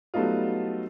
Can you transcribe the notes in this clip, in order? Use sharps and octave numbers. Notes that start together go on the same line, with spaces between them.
F#3 G3 A3 B3 D#4 F4